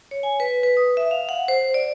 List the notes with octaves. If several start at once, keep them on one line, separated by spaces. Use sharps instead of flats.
C#5
G#5
B4
B4
D#6
E5
F5
F#5
C5
D5